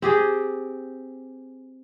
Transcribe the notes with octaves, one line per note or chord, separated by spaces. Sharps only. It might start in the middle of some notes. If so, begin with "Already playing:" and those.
C4 G4 G#4